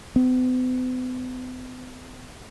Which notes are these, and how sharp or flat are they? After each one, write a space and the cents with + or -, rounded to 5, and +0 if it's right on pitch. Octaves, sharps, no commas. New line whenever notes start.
B3 +45